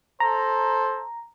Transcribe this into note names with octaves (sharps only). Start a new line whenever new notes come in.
A4 C5 A#5